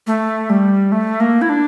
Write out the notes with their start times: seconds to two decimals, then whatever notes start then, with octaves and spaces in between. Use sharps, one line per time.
0.07 A3
0.50 G3
0.92 A3
1.20 A#3
1.42 E4
1.49 D4